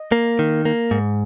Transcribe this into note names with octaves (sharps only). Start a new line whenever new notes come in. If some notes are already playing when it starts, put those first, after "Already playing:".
Already playing: D#5
A#3
D#3
A#3
G#2